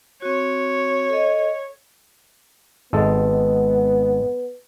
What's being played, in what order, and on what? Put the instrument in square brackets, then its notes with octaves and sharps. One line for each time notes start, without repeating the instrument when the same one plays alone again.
[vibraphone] C4 F#4 [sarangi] C#5
[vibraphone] A4 D#5
[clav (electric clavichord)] G#1 G#3 A4 [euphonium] B3